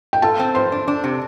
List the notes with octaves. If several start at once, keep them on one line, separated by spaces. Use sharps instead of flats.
G5
F4 A4 A5
C4
G2 C5 C6
D4
D4
C3